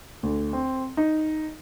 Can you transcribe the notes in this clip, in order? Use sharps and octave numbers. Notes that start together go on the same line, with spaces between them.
D2
C4
D#4